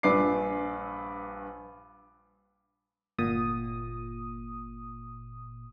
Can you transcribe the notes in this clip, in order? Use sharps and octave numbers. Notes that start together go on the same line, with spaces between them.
A#1 G2 B4 D5 D6 C7
G1 A#2 D#6